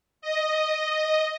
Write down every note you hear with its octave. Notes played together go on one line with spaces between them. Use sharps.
D#5